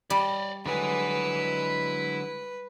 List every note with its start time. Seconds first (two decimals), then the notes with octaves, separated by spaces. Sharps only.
0.10 G3 D5 D#5
0.66 D3 F#3 G#3 E4 B4 G#5